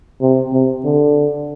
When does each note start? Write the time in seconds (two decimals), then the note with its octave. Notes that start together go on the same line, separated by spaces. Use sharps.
0.22 C3
0.53 C3
0.85 D3